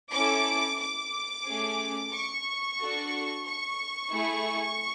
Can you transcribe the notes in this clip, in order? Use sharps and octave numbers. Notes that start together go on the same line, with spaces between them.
C#4 E4 A4 D6
D6
A3 C#4 G#4
C#6
D4 F#4 A4
C#6
A3 E4 G#4